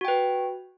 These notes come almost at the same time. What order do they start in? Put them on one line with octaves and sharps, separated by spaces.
F#4 G5 B4